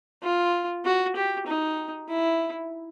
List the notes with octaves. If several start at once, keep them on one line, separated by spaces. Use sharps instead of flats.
F4
F#4
G4
D#4
E4